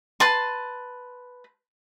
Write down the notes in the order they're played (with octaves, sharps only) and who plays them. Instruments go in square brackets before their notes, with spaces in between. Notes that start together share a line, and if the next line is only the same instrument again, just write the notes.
[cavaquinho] B4 A5 C6